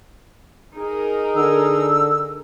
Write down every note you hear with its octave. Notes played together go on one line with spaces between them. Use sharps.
D#4 G#4 A#4
D3 E6